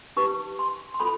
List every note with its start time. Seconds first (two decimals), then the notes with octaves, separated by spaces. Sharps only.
0.16 D#4 G4 B4 C#6
0.59 C6
0.94 C6
1.00 F4 A4 B5